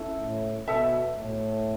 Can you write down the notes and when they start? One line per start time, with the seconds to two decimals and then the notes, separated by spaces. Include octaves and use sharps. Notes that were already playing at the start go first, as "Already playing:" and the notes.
Already playing: C#4 E4 A4
0.19 A2
0.67 B2 A4 E5 A5
1.16 A2